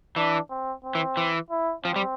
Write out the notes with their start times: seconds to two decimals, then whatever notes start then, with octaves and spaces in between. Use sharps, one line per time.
0.16 E3 D4
0.50 C4
0.84 C4
0.95 E3
1.17 E3
1.50 E4
1.85 F3 C4
1.96 G3